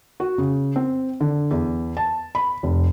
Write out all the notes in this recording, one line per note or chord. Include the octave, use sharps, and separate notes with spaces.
F#4
C#3
C4
D3
E2
A5
B5
F1